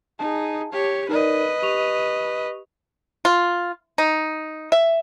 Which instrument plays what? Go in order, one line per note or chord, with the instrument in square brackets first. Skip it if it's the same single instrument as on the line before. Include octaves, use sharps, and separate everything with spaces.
[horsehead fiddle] D#4 G#4 [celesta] A5
[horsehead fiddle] G4 C#5
[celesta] D#4 A#4 D5 [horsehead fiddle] B4 D#5
[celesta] G4 C#6 F7
[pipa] F4
D#4
E5